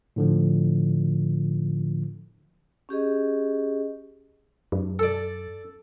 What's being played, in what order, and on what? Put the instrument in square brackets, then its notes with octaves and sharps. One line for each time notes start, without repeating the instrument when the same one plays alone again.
[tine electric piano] A2 D3 F3
[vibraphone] C#4 G4 G#4 D#5
[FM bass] F#2
[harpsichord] A4 D5